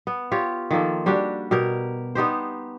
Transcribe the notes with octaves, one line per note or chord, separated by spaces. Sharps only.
B3
F4 G4 C#5
D#3 F3 A#3 A4
G3 D4 F#4 G4
B2 G4 A#4 G5
B3 D#4 G4 C5